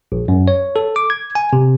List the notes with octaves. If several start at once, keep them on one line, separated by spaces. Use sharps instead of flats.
A#1
F#2
C#5
A4
D6
G#6
G#5
C3